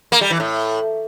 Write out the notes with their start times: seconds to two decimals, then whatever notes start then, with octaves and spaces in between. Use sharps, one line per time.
0.12 A#3
0.21 G3
0.30 E3
0.40 A2